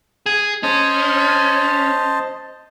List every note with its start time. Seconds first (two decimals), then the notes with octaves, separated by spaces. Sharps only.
0.26 G#4
0.63 C#4 C5 D#5 A5